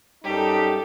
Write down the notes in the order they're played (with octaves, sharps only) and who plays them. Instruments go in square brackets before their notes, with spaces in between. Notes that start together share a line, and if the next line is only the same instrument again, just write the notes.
[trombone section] F#2 G3 D#4 [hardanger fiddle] G4 A4